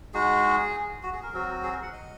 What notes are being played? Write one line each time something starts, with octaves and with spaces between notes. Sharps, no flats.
G#3 D#4 F#4 G#4
F#4
G#4
A#4
F#3 C4 F#4
G#4
A#4
F#5
D#5